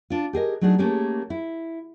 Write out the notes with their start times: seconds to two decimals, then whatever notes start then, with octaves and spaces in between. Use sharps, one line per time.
0.10 D4 F4
0.33 G4 G#4 A#4 D#5
0.61 F#3 A3 D4 D#4 G#4
0.78 A3 A#3 C#4 G4 G#4
1.30 E4